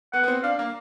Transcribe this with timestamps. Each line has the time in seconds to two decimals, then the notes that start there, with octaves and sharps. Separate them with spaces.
0.13 B3 F#5
0.23 B3
0.28 C4
0.44 D4 F5
0.59 A#3